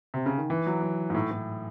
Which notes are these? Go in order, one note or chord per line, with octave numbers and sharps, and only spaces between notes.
C3
C#3
D#3
E3
F#3
F#3
G#2
A2
A2